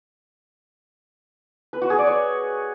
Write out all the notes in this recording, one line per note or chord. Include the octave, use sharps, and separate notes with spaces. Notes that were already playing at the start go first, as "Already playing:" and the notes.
B4
F#4
G#4
D5
C#5